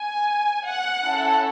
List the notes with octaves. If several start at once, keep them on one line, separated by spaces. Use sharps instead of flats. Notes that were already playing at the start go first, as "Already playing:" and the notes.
Already playing: G#5
F#5
C#4 E4 A4